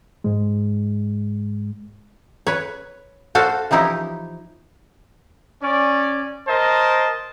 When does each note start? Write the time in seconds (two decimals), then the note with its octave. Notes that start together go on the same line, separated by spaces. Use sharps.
0.24 G#2 G#3
2.47 B4 C#5
3.35 F#4 A4 C5 F5
3.71 E3 F3 D#4 E4 G4
5.62 C#4 D5
6.48 A#4 C5 D#5 A5